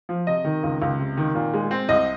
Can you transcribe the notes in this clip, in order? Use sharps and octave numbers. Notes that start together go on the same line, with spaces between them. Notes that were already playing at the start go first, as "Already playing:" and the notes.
F3
C3 D#5
D#3
C#2
C#2
C3
D#3
A#2
G#3
C4
C2 D#5